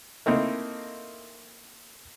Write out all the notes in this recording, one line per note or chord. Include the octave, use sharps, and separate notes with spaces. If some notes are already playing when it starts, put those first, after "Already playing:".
A3 A#3 C4 D#4 E4